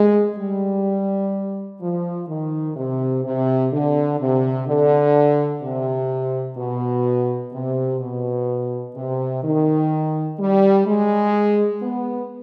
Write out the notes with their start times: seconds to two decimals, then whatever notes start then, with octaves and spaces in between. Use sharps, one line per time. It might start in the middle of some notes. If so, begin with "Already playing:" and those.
Already playing: G#3
0.39 G3
1.82 F3
2.29 D#3
2.77 C3
3.25 C3
3.72 D3
4.20 C3
4.68 D3
5.63 C3
6.58 B2
7.54 C3
8.00 B2
8.96 C3
9.44 D#3
10.39 G3
10.87 G#3
11.82 B3